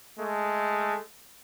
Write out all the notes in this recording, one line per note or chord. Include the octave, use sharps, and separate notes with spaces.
G#3 A3